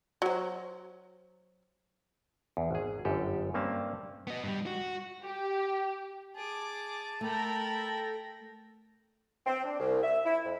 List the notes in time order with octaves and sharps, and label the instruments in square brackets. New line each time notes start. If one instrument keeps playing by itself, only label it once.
[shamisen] F#3 C5
[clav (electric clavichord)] E2
G#1 G#4
G1 F#2 G4 A4
G2 A#3 C4 C#4 A5
[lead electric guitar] B3 D#5
G2 G3
F#4
[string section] G4
[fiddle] G#4 D6 [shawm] A5
[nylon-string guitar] A3 [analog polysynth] A4 G5 A#6 [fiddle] A#4 B5
[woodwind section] C4
D4
C2
E5
E4
F2